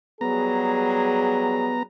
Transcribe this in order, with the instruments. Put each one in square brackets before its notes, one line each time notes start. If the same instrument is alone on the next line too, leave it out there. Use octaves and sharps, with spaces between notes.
[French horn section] F#3 G3 G#4 [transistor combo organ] B3 A#5